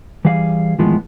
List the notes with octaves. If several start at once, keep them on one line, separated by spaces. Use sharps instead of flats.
E3 G3 G#4 F5
D#2 A2 E3 F3 G#3 B3